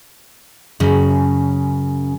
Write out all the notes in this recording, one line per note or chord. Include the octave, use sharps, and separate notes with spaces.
F#2 C#3